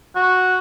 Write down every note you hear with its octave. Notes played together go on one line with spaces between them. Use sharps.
F#4